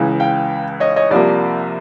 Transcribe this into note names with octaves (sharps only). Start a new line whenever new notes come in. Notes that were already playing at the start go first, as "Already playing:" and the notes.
Already playing: C#2 C#3 E3
F5 G5
C#5 D#5
C#5 D#5
C2 C3 F3 A#3 D5